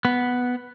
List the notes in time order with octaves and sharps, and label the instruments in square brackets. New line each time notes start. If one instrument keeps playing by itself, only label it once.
[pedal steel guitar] B3